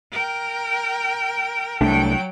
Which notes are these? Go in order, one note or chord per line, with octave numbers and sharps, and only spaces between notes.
A#4 G5
C2 F#3 A3 D4 G5